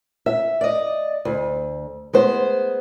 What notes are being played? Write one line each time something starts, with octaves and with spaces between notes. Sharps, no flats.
E5
D5 D#5
D2
G#3 B3 C5